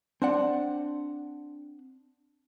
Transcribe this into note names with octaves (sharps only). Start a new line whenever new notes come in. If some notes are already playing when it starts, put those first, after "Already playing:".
C4 D4 F#5